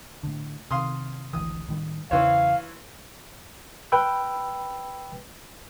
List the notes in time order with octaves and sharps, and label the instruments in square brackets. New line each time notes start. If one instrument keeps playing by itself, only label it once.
[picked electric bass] A2 D3
[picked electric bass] C3 D#3 [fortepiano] F5 C6 D#6
[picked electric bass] G#1 D2 E3 [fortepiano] D#6
[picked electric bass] A2 D#3 G3
[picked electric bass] E2 C#3 [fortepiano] E3 C5 C#5 [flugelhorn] F5
[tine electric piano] B4 G5 B5 E6